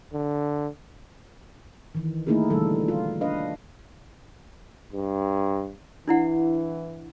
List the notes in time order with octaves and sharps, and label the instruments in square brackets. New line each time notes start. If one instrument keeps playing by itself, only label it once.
[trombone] D3
[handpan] D#3 E3
A3 A#3 D#4 E4 G#4 A#4
B2 D3 E3 G3 A4
F4
D4 B4 D#5 F5
[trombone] G2
[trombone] E3 [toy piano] D4 E4 F#5